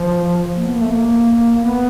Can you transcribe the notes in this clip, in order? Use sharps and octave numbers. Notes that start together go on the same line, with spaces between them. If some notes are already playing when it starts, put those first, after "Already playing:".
Already playing: F3
A#3
B3
A#3
A3
A#3
B3